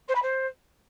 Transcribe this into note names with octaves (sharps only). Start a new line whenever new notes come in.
C5
B5
C5